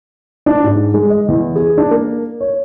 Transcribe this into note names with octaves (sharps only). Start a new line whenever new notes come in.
D4
G#2
G#3
D#5
E2
G#4
D4
A#3
C#5